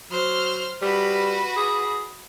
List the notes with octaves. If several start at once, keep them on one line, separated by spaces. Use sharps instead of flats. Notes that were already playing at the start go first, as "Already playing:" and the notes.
F#3 C5 F6
G3 F#4 B4
G#4